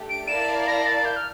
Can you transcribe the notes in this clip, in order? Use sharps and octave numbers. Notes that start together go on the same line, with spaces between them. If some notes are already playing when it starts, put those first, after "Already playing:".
Already playing: A3 D4 G4
D7
E4 A#4 D5 F5 A5 E7
A#6
A6
G6
F6